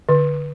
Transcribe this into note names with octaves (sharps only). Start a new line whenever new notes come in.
D3